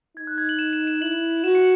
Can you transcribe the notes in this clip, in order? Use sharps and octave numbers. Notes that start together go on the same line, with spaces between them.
D#4 G#6
F#6
G#6
F#7
E7
E7
E7
E4 F#7
F#4 E7
C#7